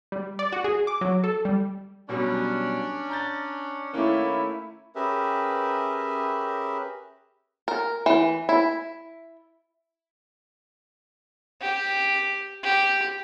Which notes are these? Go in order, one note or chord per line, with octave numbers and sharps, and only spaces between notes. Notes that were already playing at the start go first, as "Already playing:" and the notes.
G3
D5
F#4
G#4
D6
F#3
A4
G3
B2 F#3 G3 C#4 D4
A#5 G6 A6
D#3 A3 A#3 C#4 E4
C#4 G4 G#4 A#4 B4 E5
A#4
E3
E4
G4
G4